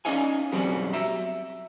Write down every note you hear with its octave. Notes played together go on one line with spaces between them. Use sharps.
C#4 D#4 D#5 F5 G#5
F#2 B2 F#3 G3 C4
E5 A#5